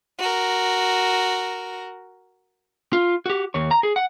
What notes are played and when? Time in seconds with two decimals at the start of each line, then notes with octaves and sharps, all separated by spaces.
0.19 F#4 A#4
2.93 F4
3.26 F#4 G4
3.54 D#2 C#5
3.71 A#5
3.83 G#4
3.96 F#5